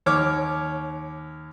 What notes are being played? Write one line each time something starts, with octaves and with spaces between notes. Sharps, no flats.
D#2 C#5 D6 F6